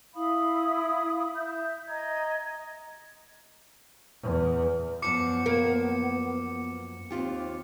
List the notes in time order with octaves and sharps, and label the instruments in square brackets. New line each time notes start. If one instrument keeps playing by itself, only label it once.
[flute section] E4 F5 B5 D#6
E5 G6
D#5 A#5 G#6
[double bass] E2
[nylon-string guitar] F#2 F3 [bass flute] B3 [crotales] D6 C#7
[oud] A#3
[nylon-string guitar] D#2 F4 G4 [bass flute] C4